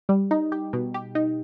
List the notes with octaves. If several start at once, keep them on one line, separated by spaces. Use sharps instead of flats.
G3
D#4
G4
B2
G4
D#4